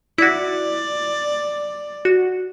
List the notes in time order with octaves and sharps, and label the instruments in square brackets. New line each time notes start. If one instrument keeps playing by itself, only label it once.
[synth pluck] E4 F#4 [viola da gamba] D5
[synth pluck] F#4